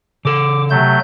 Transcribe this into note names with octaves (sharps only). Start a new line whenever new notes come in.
C#3 A4 D6
C3 F#3 A3 G6